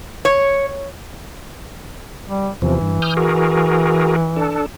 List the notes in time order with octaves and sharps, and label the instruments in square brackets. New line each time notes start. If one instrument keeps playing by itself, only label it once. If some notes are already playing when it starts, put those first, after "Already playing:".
[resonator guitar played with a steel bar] C#5
[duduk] G3
[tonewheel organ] E2 C3 F3 [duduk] E3
[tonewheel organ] G2
D#6 F6 G6
F#4 G#4 A#4
D4 A4